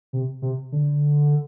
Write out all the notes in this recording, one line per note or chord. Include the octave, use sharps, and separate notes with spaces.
C3
C3
D3